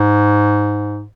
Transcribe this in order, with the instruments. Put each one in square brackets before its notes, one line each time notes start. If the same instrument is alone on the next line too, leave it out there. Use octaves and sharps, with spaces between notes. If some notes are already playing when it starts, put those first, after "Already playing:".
Already playing: [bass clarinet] G#2